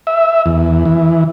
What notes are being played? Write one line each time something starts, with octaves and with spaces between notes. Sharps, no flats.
E5
E2
E3